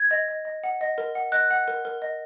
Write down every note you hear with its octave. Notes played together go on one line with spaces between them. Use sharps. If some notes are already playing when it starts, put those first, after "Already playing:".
Already playing: G#6
D#5
D#5
D#5
F#5
D#5
A#4
F#5
D#5 F#6
F#5
A#4
A#4
D#5